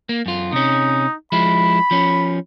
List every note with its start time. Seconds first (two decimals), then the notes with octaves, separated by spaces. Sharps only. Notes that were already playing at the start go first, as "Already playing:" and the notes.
0.09 A#3
0.26 F#2 F4
0.52 C3 C#4 D#4
1.32 F3 G#3 E4 B5
1.91 F3 C#4